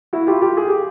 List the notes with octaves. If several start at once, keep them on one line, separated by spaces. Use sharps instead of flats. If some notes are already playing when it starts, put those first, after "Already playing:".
E4 F#4
F4 G4
F4 G4
G#4
G4